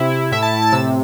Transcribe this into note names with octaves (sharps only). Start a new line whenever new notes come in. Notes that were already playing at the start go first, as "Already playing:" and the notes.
Already playing: C3 E4
E4
A2 E5
A5
A2
A6
C3 E6